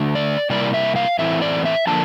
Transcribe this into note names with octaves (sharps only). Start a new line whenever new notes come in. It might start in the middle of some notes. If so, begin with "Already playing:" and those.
Already playing: D3 A3 D4
D5
C3 G3 A#3 E4 D5
E5
F5
A2 E3 A3 C4 E4 E5
D5
E5
D3 F3 A#3 D4 A5